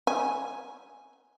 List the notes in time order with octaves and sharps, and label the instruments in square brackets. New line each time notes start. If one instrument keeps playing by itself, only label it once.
[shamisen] G#5